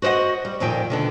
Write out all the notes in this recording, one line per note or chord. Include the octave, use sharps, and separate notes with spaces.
F#4 C5 C#5 D#5 F#5
G3
F2 A#2 D#3 G5
B2 D3 D#3